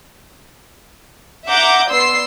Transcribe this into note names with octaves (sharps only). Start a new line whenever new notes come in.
E5 F#5 A#5 D6 G6
B3 D5 C6 E6 C7